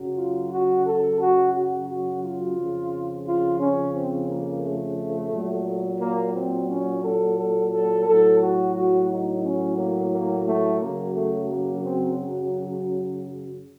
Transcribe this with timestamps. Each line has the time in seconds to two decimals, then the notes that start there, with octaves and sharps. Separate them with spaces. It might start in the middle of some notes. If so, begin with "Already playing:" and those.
Already playing: F#2 C#3 F#3
0.17 F4
0.51 F#4
0.86 A4
1.20 F#4
1.53 F#4
1.88 F#4
2.22 F4
2.57 F2 C#3 F3
3.26 F4
3.60 C#4
3.95 C4
4.28 A#3
4.62 A3
5.31 A#2 F#3
6.00 A#3
6.35 C4
6.69 C#4
7.03 A4
7.38 A4
7.72 A4
8.05 A2 F#3 A4
8.40 F#4
8.75 F#4
9.09 D#4
9.44 C#4
9.77 A#3
10.13 A#3
10.47 A3
10.81 F#2 C#3 F#3 A#3
11.15 A3
11.49 A#3
11.84 C4